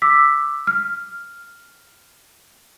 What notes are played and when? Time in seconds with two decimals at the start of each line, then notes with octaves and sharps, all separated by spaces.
0.02 D6 E6 B6
0.67 F6